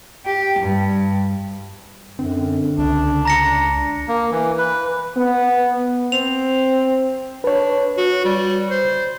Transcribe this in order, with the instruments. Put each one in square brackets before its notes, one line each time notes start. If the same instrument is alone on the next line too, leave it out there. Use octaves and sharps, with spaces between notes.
[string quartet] G4
G2
[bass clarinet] F#2 [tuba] D3 [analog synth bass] C4
[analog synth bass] C#2 [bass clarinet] D4
[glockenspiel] A#5 A#6 C#7
[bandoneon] A#3
E3
B4
[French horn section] B3
[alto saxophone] C4 [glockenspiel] F7
[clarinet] D4 [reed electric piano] B4 C#5
[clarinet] F#4
G3
C5